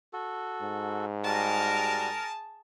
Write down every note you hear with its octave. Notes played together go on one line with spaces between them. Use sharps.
F#4 A4
G#2
G3 F#4 G#4 A#4 A5